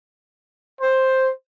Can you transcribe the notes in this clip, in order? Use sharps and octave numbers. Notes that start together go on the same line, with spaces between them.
C5